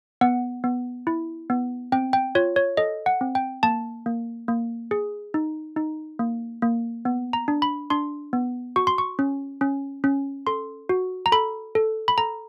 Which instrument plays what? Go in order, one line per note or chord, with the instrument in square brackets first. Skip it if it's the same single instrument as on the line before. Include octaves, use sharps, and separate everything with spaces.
[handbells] B3 F#5
B3
E4
B3
C4 G5
G5
F4 C#5
C#5
A4 D#5
F#5
C4
G5
A#3 A5
A#3
A#3
G#4
D#4
D#4
A#3
A#3
B3
A#5
D4
B5
D4 C6
B3
F#4 C#6
C6
C#6
C#4
C#4
C#4
A4 C6
F#4
A#5
A4 B5
A4
B5
A4 A#5